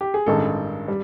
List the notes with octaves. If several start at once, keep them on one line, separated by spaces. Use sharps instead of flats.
G4
G#4
A1 G2 D#3 G#3 A4
G3